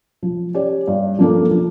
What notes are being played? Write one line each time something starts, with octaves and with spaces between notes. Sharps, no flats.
F3
C#4 G4 D5
G2
F3 A#3 D4 A4
F3